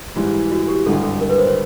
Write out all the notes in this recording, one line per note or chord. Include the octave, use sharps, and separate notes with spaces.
G#2 E3 G3
F#4
G4
G#1 G2 D3 A4
A4
A#4
B4
C5
C#5